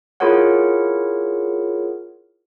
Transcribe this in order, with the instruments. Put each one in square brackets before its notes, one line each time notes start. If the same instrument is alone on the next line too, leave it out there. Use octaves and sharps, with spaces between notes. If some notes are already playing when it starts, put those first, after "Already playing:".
[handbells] E4 F4 G#4 A#4 C#5 F#5